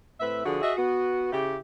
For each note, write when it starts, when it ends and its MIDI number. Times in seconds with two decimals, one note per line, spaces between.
0.20 0.42 45
0.20 0.42 60
0.20 0.42 71
0.20 0.42 76
0.45 0.60 50
0.45 0.60 53
0.45 0.60 66
0.45 0.60 68
0.62 0.73 66
0.62 0.73 68
0.62 0.73 75
0.62 0.73 76
0.77 1.31 59
0.77 1.31 66
1.32 1.57 49
1.32 1.57 64
1.32 1.57 67